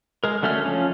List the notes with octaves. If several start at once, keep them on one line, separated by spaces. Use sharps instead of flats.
G#3 A#4
D3 F#3 A3 C#4 F6
F3 C#4